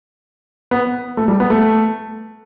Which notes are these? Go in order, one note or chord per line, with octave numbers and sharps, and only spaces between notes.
B3
A3
G3
B3
A3